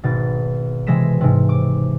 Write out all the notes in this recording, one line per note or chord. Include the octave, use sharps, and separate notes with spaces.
G#1 B2 A6
C3 E3 G#3 A#6 B6 E7
G#2 C3
D6